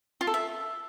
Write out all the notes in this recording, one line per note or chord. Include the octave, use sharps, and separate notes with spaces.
F4
A4
E5